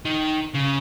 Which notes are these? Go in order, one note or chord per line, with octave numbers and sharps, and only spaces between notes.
D#3
C#3